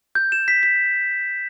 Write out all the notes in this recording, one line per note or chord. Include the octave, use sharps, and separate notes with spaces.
G6
E7
B6
B6